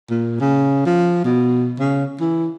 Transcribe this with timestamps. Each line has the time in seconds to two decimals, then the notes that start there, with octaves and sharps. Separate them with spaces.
0.10 A#2
0.40 C#3
0.86 F3
1.24 B2
1.79 C#3
2.20 E3